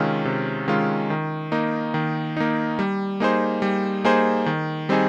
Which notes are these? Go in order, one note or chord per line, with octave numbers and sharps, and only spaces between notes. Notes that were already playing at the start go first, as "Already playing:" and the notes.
Already playing: C3 D#3 G#3 C#4 F4
C3
D#3 G#3 C#4 F4
D#3
A#3 D#4
D#3
A#3 D#4
G3
A#3 D#4 G#4 C5
G3
A#3 D#4 G#4 C5
D#3
G3 C4 D#4 G#4